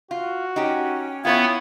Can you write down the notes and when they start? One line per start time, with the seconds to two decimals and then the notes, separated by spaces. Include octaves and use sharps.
0.11 F4 F#4
0.56 C#4 D#4 G4 G5
1.25 B3 C#4 E4 F4 B4 C#5 G5 G#6